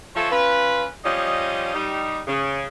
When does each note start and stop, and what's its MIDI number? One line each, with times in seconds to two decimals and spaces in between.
0.15 0.30 53
0.15 0.30 57
0.15 0.30 69
0.15 0.30 73
0.30 0.85 61
0.30 0.85 65
0.30 0.85 71
1.04 1.74 53
1.04 1.74 55
1.04 1.74 61
1.04 1.74 75
1.74 2.19 55
1.74 2.19 63
2.27 2.64 49